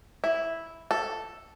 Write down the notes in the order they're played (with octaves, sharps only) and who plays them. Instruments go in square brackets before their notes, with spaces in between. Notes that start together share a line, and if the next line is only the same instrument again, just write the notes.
[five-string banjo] E4
A4